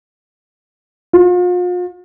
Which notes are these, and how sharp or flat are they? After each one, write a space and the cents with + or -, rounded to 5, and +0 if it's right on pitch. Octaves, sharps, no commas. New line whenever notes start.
F4 +40